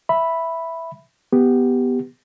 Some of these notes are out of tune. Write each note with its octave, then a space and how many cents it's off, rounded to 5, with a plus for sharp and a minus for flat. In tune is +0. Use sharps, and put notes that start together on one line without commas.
E5 +0 B5 +0
B3 +0 G4 +0